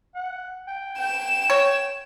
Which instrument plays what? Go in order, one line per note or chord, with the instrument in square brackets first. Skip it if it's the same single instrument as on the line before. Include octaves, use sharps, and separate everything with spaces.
[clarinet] F#5
G5
[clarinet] G5 [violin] E7
[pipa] C#5